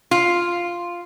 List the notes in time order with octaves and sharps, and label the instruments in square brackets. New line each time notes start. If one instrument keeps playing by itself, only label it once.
[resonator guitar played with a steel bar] F4